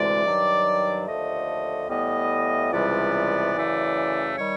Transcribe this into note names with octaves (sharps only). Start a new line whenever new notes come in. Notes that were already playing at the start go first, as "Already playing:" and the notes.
Already playing: D2 C3 E3 G#3 D5
G2 D#3 F#3
D#2 D3 F3 A3 D#5
A2 E3 G3 B3 D#5
C#2 C3 E3 G3 B3 D5
F#2 C#3 E3 A3
D#3 G3 C#5